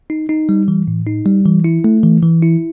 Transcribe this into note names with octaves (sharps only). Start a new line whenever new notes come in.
D#4
D#4
G3
E3
A2
D#4
G3
E3
E4
A3
E3
E3
E4